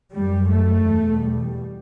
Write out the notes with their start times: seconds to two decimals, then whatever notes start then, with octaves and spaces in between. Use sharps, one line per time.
0.11 F#2 G3
0.49 A3
0.85 E2 B2
1.21 G3